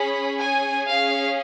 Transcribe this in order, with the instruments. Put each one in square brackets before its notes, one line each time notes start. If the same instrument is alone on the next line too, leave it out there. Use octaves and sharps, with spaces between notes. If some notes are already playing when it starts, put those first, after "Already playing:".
Already playing: [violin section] C#4 G#4 B5
G#5
C#4 G#4 F5